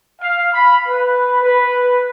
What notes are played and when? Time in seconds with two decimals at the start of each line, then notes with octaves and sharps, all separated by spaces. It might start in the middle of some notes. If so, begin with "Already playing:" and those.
0.22 F5
0.53 B5
0.88 B4
1.42 B4